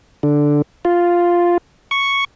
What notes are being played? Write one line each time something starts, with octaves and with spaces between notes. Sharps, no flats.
D3
F4
C#6